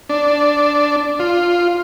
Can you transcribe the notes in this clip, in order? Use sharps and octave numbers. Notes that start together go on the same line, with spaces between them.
D4
F4